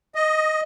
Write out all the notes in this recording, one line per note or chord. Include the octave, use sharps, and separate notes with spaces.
D#5